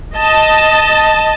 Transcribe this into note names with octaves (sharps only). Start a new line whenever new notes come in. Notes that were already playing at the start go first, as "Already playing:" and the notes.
D#5 A5